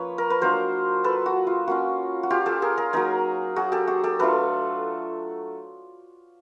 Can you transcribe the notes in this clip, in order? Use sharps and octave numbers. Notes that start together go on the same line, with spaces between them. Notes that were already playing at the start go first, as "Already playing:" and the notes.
Already playing: F3 A#3 C#4 B4 C#5
A#4
B4
F#3 A#3 D4 F4 A#4 C5
A4 B4
F#4
F4
A#3 C#4 F4 F#4
F#4
F4 G4
G4 A4
G#4 A#4
G#4 A#4
F#3 A#3 D#4 G#4 A#4
F#4 G#4
G4 A4
F#4 G#4
G4 A4
F#3 A3 D4 F4 A4 B4